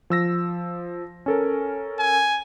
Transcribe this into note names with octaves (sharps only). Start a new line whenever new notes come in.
F3 E6 A#6
C#4 A4 A#4
G#5